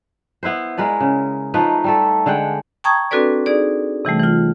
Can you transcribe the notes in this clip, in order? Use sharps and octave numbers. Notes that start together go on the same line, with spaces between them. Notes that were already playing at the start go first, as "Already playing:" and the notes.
B3 E4 B4 C5
G#3 A#4 B4 D5
C#3
F3 A3 D#4 B4
G3 A3 A4
D3 G#3 F#5 G5
G5 A5 A#5 C#6 D#6 G#6
C4 D4 F#4 A4 B4 D5
D#4 G#4 D5
C3 E3 G3 A3
E3 F4